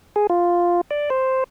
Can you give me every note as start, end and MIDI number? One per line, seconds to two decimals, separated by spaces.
0.16 0.27 68
0.30 0.81 65
0.91 1.10 74
1.10 1.44 72